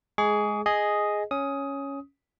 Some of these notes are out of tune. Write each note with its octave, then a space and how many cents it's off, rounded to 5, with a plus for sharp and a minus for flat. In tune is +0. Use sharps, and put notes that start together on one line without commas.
G#3 +15 G#4 +5 C#6 +45
G#4 +0 D#5 +0
C#4 +0 D#6 +15